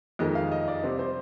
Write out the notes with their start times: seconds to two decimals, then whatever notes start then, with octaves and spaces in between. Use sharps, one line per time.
0.19 F2 D#3 G#3 D#5
0.35 F5
0.52 D#5
0.68 D5
0.84 C3 G3 C5
0.99 C5